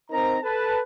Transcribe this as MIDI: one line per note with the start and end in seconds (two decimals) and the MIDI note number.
0.11 0.37 60
0.11 0.37 63
0.11 0.37 70
0.11 0.37 72
0.11 0.37 82
0.43 0.81 69
0.43 0.81 71
0.43 0.81 81